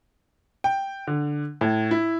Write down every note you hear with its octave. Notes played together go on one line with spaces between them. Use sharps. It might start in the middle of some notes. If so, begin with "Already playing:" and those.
G5
D3
A2
E4